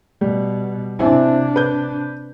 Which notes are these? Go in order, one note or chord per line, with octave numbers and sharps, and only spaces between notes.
B2 G3
C3 C4 D4 E4 G#5
B4 G6